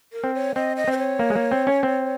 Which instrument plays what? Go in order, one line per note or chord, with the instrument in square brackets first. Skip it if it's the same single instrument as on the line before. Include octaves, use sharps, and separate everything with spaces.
[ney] A#4
[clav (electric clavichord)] C4
[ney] C#5
[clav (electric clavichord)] C4 [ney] D#5
[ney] D#5
[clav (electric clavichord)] C4 [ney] C5
[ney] C#5
[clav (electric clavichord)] A#3
G#3
A#3
C4
C#4
C4